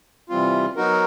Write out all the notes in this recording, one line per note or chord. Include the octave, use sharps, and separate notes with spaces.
C3 E3 G3 C4 F4
F#3 B3 D#4 F#4 A#4